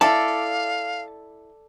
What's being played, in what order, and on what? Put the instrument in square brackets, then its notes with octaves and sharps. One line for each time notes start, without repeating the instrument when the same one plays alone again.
[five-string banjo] E4 [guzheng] A4 D5 [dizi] F5 [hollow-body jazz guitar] A5